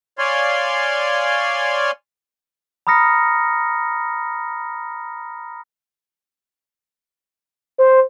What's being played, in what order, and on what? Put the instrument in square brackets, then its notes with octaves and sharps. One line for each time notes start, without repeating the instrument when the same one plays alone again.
[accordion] C#5 D5 F5 G#5 C6
[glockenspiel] A#5 B5 D#6 F6 A#6 C#7
[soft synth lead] C5